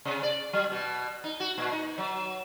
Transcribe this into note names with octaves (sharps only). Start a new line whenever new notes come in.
C3
D5
F#3
B2
D#4
F#4
A#2
D#4
F#3